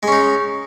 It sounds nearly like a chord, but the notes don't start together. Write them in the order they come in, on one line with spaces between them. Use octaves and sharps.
G#3 C#4 D#4